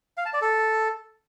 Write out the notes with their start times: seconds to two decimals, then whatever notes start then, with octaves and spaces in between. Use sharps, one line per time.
0.17 F5
0.25 A5
0.34 D5
0.42 A4